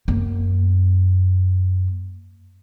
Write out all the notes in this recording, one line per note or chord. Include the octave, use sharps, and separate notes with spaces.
F#2 A#3